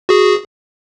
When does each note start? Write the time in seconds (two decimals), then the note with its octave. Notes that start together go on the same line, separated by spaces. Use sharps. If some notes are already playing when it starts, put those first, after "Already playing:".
0.09 F#4 G#4